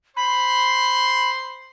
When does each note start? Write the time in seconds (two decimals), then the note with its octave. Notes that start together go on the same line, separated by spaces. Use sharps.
0.17 C5 B5 C6